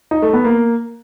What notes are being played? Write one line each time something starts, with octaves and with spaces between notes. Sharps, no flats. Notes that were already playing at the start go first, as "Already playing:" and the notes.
D#4
A3
B3
A#3